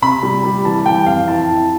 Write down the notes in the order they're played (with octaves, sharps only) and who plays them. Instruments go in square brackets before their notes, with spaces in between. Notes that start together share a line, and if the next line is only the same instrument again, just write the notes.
[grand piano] C3 B5
G3
G3
E3 A5
G3 G5
F2 F5
E4 A5
E4